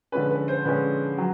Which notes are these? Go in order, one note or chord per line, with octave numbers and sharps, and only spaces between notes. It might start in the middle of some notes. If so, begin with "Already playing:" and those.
D3 F3 G#3 C#4 B4
B4
C5
D3 F3 G#3 C#4 B4
F#3